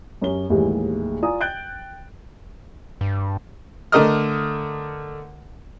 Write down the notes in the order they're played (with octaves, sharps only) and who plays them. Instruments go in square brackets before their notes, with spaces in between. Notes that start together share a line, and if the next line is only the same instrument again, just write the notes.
[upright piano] F#2 C#4 G4 G7
A#1 D#2 A2 E3 G3 G#3
F4 D5 G#5 A#5 D#6
G5 F#6 G6 A6 D7 G7
[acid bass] G2
[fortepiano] D3 A3 A#4 D#5 D#6 F6